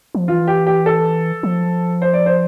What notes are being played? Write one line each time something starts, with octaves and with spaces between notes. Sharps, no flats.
F3
E3 F4
G4
G4
A4
F3
C5
D5
C5